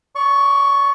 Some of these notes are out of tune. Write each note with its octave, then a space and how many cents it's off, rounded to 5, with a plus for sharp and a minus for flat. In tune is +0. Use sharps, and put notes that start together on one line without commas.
D5 -35 C#6 +5